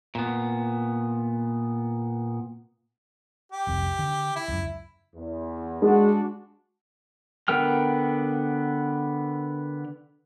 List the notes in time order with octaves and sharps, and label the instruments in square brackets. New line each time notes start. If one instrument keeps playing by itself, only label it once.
[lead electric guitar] A#2 B3
[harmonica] G4
[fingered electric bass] F1 C2
D3
[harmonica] E4
[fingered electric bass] C#2 F#2
[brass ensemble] E2
[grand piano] G#3 [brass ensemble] D4 F#4
[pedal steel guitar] D3 B3 A#4 G5 F6